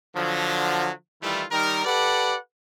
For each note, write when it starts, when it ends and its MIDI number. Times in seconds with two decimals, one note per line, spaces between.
0.16 0.90 50
0.16 0.90 53
0.16 0.90 54
1.22 1.43 51
1.22 1.43 52
1.22 1.43 55
1.22 1.43 57
1.22 1.43 64
1.22 1.43 65
1.51 1.83 51
1.51 1.83 55
1.51 1.83 63
1.51 1.83 70
1.85 2.36 67
1.85 2.36 69
1.85 2.36 71
1.85 2.36 74
1.85 2.36 78